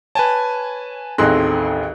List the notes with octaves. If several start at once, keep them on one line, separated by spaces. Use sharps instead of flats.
B4 C#5 G#5 A5
A1 D#2 C4 D#4 G#4 A4 C6 F#6